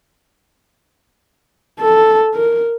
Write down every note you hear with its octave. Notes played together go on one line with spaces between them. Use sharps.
A4
A#4